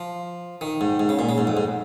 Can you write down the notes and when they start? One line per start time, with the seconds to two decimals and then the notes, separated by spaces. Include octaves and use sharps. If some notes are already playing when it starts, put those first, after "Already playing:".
Already playing: F3
0.61 D#3
0.81 G#2
1.00 G#2
1.09 C#3
1.19 A#2
1.29 C#3
1.38 G#2
1.47 F2
1.57 G#2